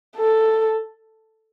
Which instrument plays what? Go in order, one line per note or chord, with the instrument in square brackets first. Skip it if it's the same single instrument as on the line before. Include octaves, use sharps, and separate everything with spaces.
[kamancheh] A4